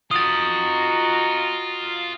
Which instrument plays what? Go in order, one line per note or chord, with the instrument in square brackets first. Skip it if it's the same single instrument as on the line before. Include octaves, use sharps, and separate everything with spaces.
[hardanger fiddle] D#4 F#4 [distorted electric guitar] F4 G5 [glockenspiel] D#6 A6